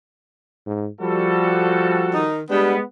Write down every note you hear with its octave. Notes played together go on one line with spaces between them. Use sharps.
G#2
F3 G3 F#4 A4
D#3 D#4
G3 G#3 B3 D4 G4